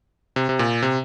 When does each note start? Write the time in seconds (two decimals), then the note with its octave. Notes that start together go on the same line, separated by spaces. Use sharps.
0.36 C3
0.49 C3
0.59 A#2
0.82 C3